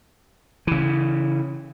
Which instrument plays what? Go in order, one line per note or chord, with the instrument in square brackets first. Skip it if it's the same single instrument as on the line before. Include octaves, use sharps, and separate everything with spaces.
[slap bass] C#3 E3